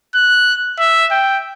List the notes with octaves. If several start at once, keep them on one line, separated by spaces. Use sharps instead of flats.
F#6
E5
G5